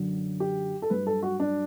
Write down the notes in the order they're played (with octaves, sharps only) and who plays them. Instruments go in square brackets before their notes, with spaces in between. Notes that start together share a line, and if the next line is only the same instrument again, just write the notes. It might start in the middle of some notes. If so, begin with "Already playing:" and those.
Already playing: [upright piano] F#2 D3 F#3
G4
A4
G2 F#3 B4
A4
F#4
D4